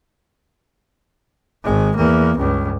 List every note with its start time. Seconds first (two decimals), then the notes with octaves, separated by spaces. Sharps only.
1.64 G#1 G#3
1.97 E2 A#3
2.38 C#2 G2